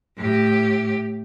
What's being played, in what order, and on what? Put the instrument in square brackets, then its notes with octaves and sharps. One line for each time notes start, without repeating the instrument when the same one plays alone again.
[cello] A2 G4